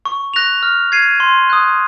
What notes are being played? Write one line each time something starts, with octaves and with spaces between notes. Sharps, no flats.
C#6
F#6 A#6 F7
F6
G#6 C7 D#7
C6
D#6 F#6